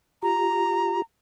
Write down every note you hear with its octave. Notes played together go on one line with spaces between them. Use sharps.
F4 G4 A#5